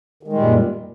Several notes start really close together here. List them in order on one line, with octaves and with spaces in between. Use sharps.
D#3 G#3 G3 A#2 F#2